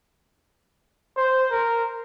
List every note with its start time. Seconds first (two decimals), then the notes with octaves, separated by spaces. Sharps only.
1.17 C5
1.50 A#4